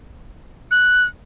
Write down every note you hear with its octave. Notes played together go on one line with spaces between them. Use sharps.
F#6